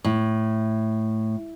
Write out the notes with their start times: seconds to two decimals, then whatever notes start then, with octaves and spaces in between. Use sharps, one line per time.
0.04 A2